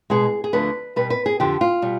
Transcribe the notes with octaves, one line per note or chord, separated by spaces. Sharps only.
B2 G#3 G#4
G#4
D2 D3 F3 B4
B2 G3 B4
B4
G#4
F2 D3 F3 G4
F4
B2 G3